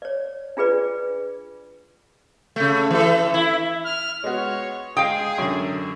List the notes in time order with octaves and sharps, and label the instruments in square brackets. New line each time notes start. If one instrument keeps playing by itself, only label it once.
[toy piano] C#5 D5
D4 F4 G#4 B4 D5
[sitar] C#3 A3
E3 A4
E4
[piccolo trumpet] F6
[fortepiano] G#3 B3 F#4 [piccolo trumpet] C#5
[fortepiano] G#3 D#5 D#6 [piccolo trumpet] G#4 [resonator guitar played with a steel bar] F5 G5
[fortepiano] F#2 D3